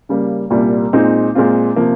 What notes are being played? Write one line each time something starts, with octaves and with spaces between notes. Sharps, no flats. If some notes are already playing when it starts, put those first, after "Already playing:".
C#3 G3 A#3
C2 A#2 G3 A#3
A#2 G#3 C4 D#4
A#2 G#3 C4 F4
C3 F3 A#3